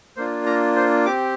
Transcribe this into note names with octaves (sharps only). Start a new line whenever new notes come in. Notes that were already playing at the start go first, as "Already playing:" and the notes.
A#3 D4 F4 C5
A#5
C5
C4 G4 D6